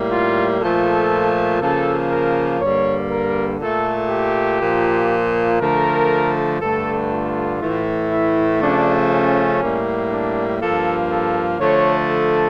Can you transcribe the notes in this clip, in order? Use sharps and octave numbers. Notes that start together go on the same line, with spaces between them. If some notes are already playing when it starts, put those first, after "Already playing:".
Already playing: A2 G3 A#3
F4
A#2 F3 A3 A4
C#3 F3 A#3 A4
A#4
G2 D3 G3 A#3 C#5
A#4
A#2 A3 A4
G4
A#2 F3 A#3
D3 F3 A3 A#4
G2 D3 A3 A4
F4
A2 E3 A3
E4
C#3 F3 A3 D4
C#4
A2 G3 A#3
D4
G2 F3 A#3 A4
A4
D3 F3 A3 C#5
A4